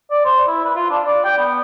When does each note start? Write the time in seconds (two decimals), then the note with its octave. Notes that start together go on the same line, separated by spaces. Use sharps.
0.11 D5
0.25 C5
0.47 E4
0.64 B4
0.76 F4
0.90 D4
1.05 D5
1.25 G5
1.38 B3